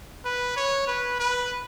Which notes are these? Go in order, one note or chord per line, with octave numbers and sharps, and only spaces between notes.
B4
C#5
B4
B4